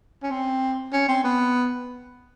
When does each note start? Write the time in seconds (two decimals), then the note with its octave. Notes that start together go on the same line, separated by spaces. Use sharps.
0.23 C#4
0.31 C4
0.93 C#4
1.09 C4
1.24 B3